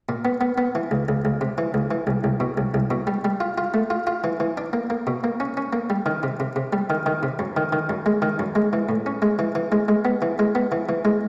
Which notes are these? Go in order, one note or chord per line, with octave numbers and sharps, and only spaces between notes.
A#2
B3
B3
B3
E3
C#2
C#2
C#2
C3
E3
C#2
E3
C2
C2
B2
C2
C2
B2
G3
G3
F4
F4
A3
F4
F4
E3
E3
D4
A#3
A#3
B2
A#3
C#4
C#4
A#3
G3
D#3
C3
C3
C3
G3
D#3
D#3
C3
F#2
D#3
D#3
F#2
G#3
D#3
F#2
G#3
E3
A2
C#4
G#3
E3
E3
G#3
G#3
B3
E3
G#3
B3
E3
E3
G#3